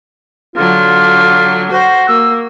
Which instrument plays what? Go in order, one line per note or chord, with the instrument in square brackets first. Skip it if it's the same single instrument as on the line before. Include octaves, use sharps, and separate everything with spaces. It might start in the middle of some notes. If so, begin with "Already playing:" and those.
[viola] D3 F#3 [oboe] F4
[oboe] F#4 [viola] C5
[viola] A#3 [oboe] E6